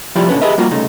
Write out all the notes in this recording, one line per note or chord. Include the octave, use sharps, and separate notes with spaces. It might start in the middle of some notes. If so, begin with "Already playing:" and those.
F3 G3 E4 F4 G4
A#2 D3 C#4 B4
G4 G#4 A#4 B4 D#5 E5
G3 A#3 F4 F#4
C2 C#3 A3 D#4